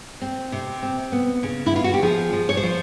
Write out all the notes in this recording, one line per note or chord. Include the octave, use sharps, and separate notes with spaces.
C4
C3
C4
B3
C#3
E4
B3 F4
F#4
G4
F3 G#4
F3
C#5
C5
F3